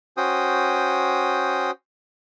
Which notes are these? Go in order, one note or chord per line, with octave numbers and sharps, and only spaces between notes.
C#4 F#4 C5 G5 D#6